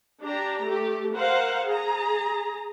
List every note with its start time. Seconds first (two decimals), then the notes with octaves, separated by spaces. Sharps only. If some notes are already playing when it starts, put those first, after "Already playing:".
0.24 D4 G4 A#5
0.64 A3 G4
1.16 A#4 C5 F5 F#5
1.67 G#4 A#5